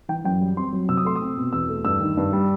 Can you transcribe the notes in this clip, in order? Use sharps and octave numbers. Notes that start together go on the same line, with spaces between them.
E3 G5
F#2 G5
G3
C4 C6
F#3
C3 E6
D#6
A3 C6
D#6
C4
B2
E2 E6
A3
G2 E6
D#3
G2
G3